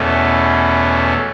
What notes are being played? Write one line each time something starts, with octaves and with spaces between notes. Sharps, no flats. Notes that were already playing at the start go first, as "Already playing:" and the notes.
Already playing: E2 B2 A3 C#4